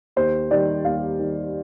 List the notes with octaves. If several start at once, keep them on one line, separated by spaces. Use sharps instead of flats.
D#2 C5
D#3 G3 D5
D#2 F5
D#3 G3